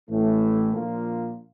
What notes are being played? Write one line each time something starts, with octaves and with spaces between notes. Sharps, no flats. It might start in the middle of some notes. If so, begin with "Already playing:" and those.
A1 A2 E3 A3
A#2 F3 A#3 D4 F4